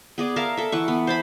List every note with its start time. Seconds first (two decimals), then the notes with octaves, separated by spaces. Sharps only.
0.18 B3 G#4 D5
0.36 A#4 E5 F5 A5
0.57 A4 E5
0.72 E3 F#5 C#6
0.88 B3
1.07 C5 A5 B5